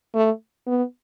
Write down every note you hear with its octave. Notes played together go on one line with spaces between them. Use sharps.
A3
B3